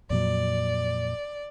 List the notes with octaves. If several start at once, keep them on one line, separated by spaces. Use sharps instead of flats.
F2 A#2 F#3 D5